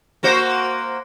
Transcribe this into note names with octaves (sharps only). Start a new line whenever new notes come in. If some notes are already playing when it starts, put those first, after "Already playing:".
A#3 F#4 C5